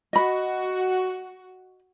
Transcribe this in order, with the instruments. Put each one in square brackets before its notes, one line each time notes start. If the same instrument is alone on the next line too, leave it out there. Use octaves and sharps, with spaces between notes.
[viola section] F#4 [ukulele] D#5 B5